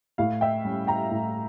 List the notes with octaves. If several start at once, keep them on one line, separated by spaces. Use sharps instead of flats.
A2 F5
E5 G5
G3 C#4
G5 A#5
A2